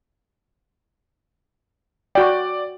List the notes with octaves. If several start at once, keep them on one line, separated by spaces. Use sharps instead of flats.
F#4 D5 G5